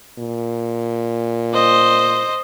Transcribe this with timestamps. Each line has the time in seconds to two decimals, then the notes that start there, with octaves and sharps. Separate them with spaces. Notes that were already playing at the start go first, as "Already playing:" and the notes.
0.18 A#2
1.54 C5 D#5